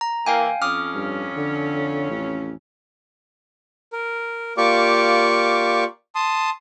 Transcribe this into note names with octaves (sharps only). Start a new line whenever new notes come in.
A#5
E3 A#3 F5 G5 G#5
F2 C#4 D6 D#6 F6
G2
D3
A1
A#4
A#3 F4 G4 D5 C#6 D6
A5 C6 D#6